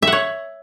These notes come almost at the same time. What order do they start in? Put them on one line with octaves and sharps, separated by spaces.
E5 F#5 C#5